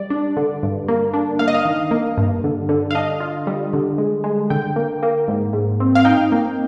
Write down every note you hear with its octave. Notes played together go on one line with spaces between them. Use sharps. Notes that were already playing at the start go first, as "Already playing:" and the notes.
Already playing: G3 D5
D4
D3
G2
A#3
D4
A#3 F5
D#5
F5
D#3
A#3
G2
D3
D3
F5
D4 D#5
F4
G3
D3
G#3
G#3
D3 G5
A#3
A#3
G#2
G#2
C4
F5
D#4 G5
A#3